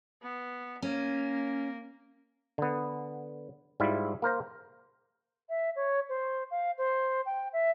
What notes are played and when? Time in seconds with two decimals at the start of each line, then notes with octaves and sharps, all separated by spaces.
0.22 B3
0.82 A#3 C#4
2.58 D3 B3
3.80 G#2 G3 E4 F4 E5
4.22 A#3 A#4 C5 A#5
5.49 E5
5.76 C#5
6.09 C5
6.51 F5
6.78 C5
7.26 G5
7.53 E5